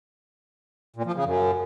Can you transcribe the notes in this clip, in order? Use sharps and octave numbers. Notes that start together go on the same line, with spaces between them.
A#2
F3
C#3
F#2